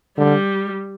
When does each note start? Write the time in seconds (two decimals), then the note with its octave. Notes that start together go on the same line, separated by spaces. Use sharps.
0.18 D3 G3